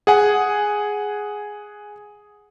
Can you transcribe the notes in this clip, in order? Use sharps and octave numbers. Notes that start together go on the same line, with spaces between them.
G#4 F#5 G#5